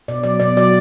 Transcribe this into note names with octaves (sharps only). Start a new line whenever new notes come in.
B2 D5
F#3 D5
B2 D5
F#3 D5